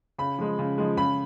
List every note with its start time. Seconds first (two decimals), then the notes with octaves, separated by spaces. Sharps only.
0.18 C#3 B5
0.38 F3 G#3
0.59 C#3
0.78 F3 G#3
0.97 C#3 B5